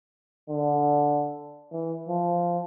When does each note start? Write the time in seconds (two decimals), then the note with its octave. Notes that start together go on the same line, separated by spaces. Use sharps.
0.50 D3
1.72 E3
2.08 F3